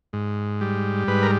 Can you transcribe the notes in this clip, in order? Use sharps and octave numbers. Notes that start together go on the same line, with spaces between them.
G#2
G3
G#2 B4
A#4